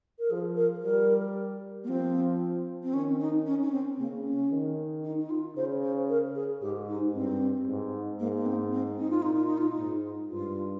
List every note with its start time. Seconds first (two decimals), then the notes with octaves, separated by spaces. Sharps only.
0.19 A#4
0.31 F3 G#4
0.57 A#4
0.83 G3 A#4
1.84 A#3
1.88 F3 C4
2.83 C4
2.93 D#3 C#4
3.20 D#4
3.46 C#4
3.62 C#4
3.72 C4
3.99 C#3 A#3
4.26 C#4
4.51 D#3
5.04 D#4
5.19 D#4
5.30 F4
5.56 C#3 C5
5.83 C5
6.09 A#4
6.35 G#4
6.62 G#2 G4
6.88 D#4
7.14 G2 C4
7.67 G#2
8.20 G#2 A#3
8.37 A#3
8.46 C4
8.73 C4
8.99 D#4
9.10 F4
9.22 A#2 D#4
9.34 F4
9.46 D#4
9.58 F4
9.69 D#4
9.77 G#2
10.30 G2 F4